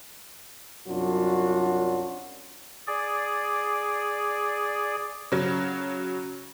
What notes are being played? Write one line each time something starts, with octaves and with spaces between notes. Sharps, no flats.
C2 F#2 F#3 D4 F4 F#4
G#4 D5
C#3 F#3